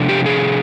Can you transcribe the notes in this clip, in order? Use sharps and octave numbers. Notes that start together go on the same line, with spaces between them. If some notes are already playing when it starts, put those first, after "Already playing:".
Already playing: C3 F3 A3 D4
G4
G#4